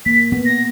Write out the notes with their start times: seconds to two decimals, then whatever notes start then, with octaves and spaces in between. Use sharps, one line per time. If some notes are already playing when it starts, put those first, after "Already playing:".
0.06 A#3 B6
0.32 B3
0.46 A#6